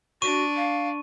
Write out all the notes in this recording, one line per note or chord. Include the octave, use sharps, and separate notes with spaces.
D4 F#4 C#6 D#7
F5